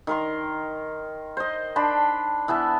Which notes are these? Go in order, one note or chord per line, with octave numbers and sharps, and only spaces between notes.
D#3 A#4 C6
C5 D#5
D4 A5 B5 C6
E3 B3 E4 A5